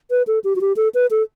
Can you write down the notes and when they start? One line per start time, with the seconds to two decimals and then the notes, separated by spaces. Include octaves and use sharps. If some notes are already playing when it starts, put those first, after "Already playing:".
0.11 B4
0.27 A4
0.44 G4
0.56 F#4
0.61 G4
0.77 A4
0.95 B4
1.11 A4